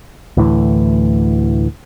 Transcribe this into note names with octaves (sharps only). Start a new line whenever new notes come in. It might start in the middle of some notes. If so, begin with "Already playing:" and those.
D2 A2 E3